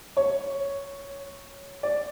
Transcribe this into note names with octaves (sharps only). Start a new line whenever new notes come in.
C#5
D5